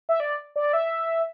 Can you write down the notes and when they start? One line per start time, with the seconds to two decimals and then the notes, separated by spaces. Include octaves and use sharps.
0.09 E5
0.20 D5
0.56 D5
0.73 E5